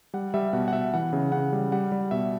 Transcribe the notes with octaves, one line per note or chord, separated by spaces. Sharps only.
G3 F#5
G3 E5
B2 F#5
F#5
B2 E5
E3 F#5
C#3
C#3 F#5
G3
G3 F#5
G3
B2 E5